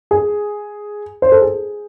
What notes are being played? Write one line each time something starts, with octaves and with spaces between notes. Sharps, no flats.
G#4
C5
A4
G#4